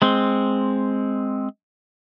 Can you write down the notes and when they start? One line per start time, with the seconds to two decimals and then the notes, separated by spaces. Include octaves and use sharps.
0.02 G#3 C4